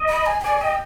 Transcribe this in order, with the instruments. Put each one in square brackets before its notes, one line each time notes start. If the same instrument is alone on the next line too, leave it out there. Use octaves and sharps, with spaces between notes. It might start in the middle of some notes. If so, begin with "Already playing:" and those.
Already playing: [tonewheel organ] D#5
[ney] B5
G#5
G5
[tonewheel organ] D5 [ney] G#5
[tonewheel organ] D#5 [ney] G5